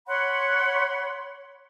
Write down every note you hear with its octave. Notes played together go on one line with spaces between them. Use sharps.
C#5 F#5 B5 C6